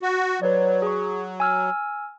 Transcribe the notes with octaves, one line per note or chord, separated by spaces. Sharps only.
F#4
F#3 B4 C#5 D5
G#4 C#6
G#5 E6 F6